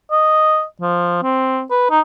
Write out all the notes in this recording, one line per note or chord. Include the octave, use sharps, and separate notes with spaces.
D#5
F3
C4
B4
D#4